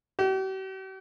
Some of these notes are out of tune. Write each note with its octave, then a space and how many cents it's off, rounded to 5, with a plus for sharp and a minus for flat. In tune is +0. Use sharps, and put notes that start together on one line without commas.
G4 -45